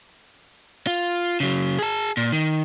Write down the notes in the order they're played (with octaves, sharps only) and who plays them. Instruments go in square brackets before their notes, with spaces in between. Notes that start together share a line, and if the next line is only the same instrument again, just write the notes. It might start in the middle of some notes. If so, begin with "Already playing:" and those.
[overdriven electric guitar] F4
C#3 F#3
G#4 A5
A#2
D#3